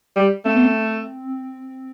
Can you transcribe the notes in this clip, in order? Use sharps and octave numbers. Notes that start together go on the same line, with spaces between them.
G3
A3 C4
B3
C4